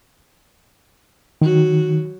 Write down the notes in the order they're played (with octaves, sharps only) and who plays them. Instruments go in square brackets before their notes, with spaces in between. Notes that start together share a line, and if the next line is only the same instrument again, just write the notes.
[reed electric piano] D#3 [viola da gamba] F#3 F#4